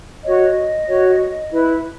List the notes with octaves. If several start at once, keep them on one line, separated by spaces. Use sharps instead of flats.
F#4 C#5 D#5
F#4 C#5
E4 B4